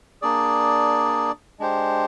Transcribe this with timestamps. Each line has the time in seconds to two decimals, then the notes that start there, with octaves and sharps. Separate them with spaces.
0.22 A#3 D4 G#4 D5
1.60 G#3 D4 G4 C5